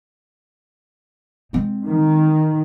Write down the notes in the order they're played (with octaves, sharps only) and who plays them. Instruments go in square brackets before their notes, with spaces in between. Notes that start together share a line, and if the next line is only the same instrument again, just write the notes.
[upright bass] G#3 C4
[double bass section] D#3